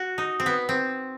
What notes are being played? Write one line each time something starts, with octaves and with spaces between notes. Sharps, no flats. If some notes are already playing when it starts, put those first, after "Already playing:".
Already playing: F#4
D#4
C4
B3
C4